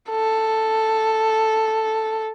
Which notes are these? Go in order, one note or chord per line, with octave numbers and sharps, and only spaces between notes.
A4